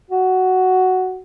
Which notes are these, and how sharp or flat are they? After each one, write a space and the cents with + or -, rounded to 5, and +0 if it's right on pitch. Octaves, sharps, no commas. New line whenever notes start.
F#4 +5